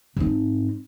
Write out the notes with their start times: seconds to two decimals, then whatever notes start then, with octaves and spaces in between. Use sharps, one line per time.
0.16 G#2 C4